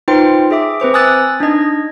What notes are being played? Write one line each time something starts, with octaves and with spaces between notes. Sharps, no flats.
D#4 F4 B4 C5 G5 C6
G#4 E5 D6
C4 B4 C5 D6
G#5 D#6 E6 F#6 A6
D4 D#4 D#5 G#6